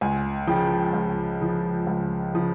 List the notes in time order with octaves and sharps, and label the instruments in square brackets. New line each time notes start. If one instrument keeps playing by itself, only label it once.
[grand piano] C#2 G#5
C#3 F3 G5
C#2
C#3 F3
C#2
C#3 F3